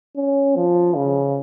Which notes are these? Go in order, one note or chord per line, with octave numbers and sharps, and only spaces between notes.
C#4
F3
C#3